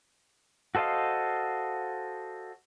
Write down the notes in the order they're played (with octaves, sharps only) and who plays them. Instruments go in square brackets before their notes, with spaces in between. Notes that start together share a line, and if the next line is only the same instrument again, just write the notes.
[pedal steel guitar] F#4 A4 C5 D#5 F5